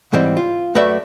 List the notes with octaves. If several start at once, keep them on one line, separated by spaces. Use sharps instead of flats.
C#2 G#2 E3 G3 C4
F4
F#2 A3 F#4 B4 D5 E5